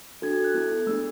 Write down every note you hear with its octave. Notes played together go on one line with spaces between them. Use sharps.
D4 F#4 A4 G#6
G#6
F#6
B3 E4 A4
A3 D4 G#4 E6